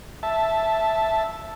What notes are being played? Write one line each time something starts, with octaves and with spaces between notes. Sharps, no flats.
E5 A5